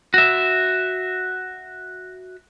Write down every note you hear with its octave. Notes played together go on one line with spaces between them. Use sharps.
F#4 E5